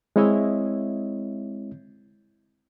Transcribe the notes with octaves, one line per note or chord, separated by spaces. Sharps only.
G#3 C4 E4 C#5 D#5 E5